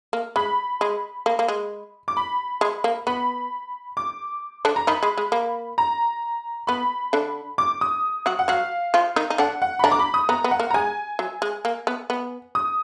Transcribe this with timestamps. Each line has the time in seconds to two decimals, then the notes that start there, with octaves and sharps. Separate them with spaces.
0.13 A#3
0.36 G#3 B5
0.81 G#3
1.26 A#3
1.39 A#3
1.48 G#3
2.08 D6
2.17 B5
2.61 G#3
2.84 A#3
3.07 B3 B5
3.97 D6
4.65 D3 D4
4.76 A#5
4.87 D#3 D#4 B5
5.03 G#3
5.18 G#3
5.32 A#3
5.78 A#5
6.67 B3 B5
7.13 D3 D4
7.58 D6
7.81 D#6
8.26 F#3 F#4
8.39 F#5
8.48 F#3 F#4 F5
8.94 F3 F4
9.16 D#3 D#4
9.30 D#4
9.38 D3 D4 F#5
9.62 F#5
9.79 B5
9.83 D3 D4 A#5
9.92 D6
9.99 B5
10.14 D#6
10.29 B3 A#5
10.44 B3
10.51 F#5
10.60 A#3
10.71 A#5
10.74 G#3 G#5
11.19 F#3
11.42 G#3
11.65 A#3
11.87 B3
12.10 B3
12.55 D#6